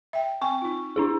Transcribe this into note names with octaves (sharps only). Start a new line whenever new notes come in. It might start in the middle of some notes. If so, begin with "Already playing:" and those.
E5 G5
C4 G5 G#5 C#6
D#4 F4
D4 E4 G#4